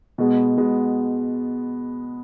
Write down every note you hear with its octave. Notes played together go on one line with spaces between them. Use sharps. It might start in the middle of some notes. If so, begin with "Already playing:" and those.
B2 G#3 B3
B2 G#3 B3